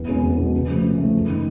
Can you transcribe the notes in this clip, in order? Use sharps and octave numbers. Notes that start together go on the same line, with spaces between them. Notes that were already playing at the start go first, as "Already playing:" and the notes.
Already playing: E2
B2 G#3 C#4
E2
B2 G#3 C#4
C#3
F3 A3
C#3
F3 A3
F#1
D#3